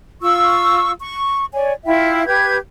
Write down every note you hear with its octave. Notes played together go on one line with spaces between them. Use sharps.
F4 C#6 E6
C#6
C#5 D5 G#5
E4 F4 E5 G5
G4 B4 G6 G#6